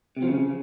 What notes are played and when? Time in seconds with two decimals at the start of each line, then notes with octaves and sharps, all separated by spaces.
0.17 C3
0.22 F3
0.28 C#3